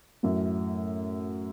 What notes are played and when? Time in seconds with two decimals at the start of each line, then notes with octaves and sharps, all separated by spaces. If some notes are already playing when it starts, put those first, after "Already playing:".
0.23 F#2 A2